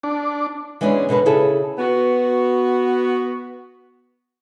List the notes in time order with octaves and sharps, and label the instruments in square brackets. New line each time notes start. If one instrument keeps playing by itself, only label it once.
[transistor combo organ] D4
[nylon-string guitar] E3 G#3 B3 C#4 D4 E4
B2 D3 A#4 B4
C#3 E4 G#4 A4
[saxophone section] B3 F#4